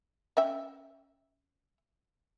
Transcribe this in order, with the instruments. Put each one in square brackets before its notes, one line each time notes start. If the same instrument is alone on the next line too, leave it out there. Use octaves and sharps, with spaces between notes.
[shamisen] C#4 E5 G5